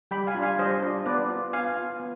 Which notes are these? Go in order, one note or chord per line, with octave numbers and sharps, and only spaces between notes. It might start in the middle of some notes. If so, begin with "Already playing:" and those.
G3 G5 B5
F5 G#5
D4 F4
F5 G#5
G3 C5 D#5
D4 F4
B3 B4 D5
F4
B3 F5 G#5
F4
B3